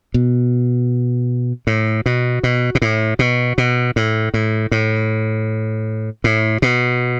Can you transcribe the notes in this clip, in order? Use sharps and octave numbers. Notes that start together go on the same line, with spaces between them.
B2
A2
B2
B2
B2
A2
B2
B2
A2
A2
A2
A2
B2